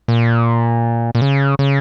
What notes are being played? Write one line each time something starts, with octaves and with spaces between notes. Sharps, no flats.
A#2
A#2
C#3
C#3